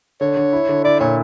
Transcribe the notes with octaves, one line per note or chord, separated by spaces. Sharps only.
D3 C#5
D3
E4
D3
E4 D5
A#2 C#5